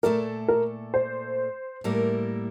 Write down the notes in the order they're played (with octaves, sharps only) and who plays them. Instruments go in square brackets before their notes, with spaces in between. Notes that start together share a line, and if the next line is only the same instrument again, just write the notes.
[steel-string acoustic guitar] A#2 A3 E4 A4 D5 [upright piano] A#4
[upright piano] A#4
C5
[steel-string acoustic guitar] A2 G3 A#3 E4 A#4